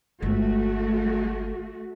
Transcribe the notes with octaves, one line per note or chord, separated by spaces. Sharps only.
G1 G#3 A3 F#4